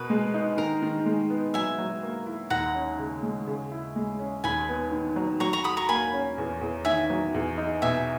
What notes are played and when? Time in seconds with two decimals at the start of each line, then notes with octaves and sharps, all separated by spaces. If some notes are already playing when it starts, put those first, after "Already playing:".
Already playing: B2 A#4 B4
0.10 G#3
0.34 D#4
0.57 D#3 A#4
0.82 D#3
1.06 G#3
1.30 B3
1.54 F#3 E5 G#5
1.78 F#3
2.03 A#3
2.26 E4
2.50 D#2 F#5 A#5
2.75 C#4
2.99 C#3
3.23 G#3
3.47 C#3
3.71 E4
3.96 G#3
4.20 C#4
4.44 D#2 G#5 B5
4.69 B3
4.92 D#3
5.16 F#3
5.40 F#3 A#5 C#6
5.53 A#5 C#6
5.64 F#4 B5 D#6
5.77 A#5 C#6
5.88 A#3 G#5 B5
6.13 C#4
6.38 E2
6.61 E2
6.85 D#3 E5 G#5
7.10 F#3
7.34 E2
7.58 D#4
7.82 B2 E5 G#5